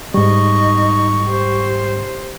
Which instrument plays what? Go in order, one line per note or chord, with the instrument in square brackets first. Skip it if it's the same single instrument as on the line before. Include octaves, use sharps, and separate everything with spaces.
[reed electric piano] G#2 G3 [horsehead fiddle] D#4 D#5 [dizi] C#6
[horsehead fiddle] G4 C5